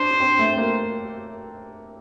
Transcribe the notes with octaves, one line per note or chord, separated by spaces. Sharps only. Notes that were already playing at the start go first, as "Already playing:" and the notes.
Already playing: D4 C5
D4
C4
A3
C4
A#3